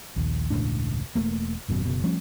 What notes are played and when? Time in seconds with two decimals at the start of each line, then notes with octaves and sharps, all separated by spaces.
0.16 A#1 D#2
0.50 E1 C#2 A2 D4
1.15 E1 G2 A3 A#3
1.69 G#1 F#2 B2
1.85 F#1 B2
2.04 F3 G3 A3 C#4